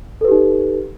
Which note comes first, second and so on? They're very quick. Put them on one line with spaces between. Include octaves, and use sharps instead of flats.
A4 B4 G4 D#4